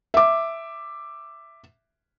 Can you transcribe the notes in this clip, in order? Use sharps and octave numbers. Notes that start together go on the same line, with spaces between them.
E5 D6